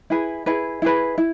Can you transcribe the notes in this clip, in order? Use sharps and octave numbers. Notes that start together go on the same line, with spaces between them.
E4 G#4 B4
E4 G#4 B4
E4 G#4 B4
E4